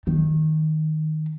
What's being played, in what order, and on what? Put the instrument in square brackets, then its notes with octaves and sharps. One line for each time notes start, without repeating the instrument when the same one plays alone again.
[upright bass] D#3